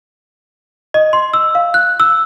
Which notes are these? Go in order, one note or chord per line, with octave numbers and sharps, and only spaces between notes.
D#5
C6
E6
F5
F#6
E6